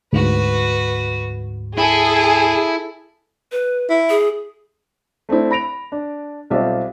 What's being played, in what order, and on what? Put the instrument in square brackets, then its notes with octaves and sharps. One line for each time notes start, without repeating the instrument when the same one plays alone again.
[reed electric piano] D2 G#2 [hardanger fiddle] F#4 B4
[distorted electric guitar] E4 [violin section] G#4 [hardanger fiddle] A4
[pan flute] B4
[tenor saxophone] E4
[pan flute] G#4
[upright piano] A3 C4 D4 E4
B5 A#6 D7 F7
D4
B1 G3 C4 F4 D5 E5